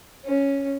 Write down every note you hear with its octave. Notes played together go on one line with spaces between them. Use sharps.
C#4